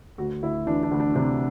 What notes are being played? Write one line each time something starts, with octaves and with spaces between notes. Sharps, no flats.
D2 F#4
D2 E4
E3 D4
D4
D2
D4
C3 D4